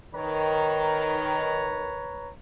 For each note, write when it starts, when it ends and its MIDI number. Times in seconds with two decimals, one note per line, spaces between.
0.14 1.98 51
0.14 2.33 71
0.14 2.33 73
0.14 2.33 82